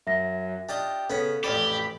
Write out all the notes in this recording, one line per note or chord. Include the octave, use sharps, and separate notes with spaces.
F#2 E5 A#6
D4 F4 G4 D#5
C#3 B3 C#4 A4
A1 F2 G4 D5 B5